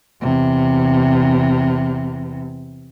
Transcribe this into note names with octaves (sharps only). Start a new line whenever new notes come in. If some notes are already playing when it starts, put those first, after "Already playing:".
E2 C3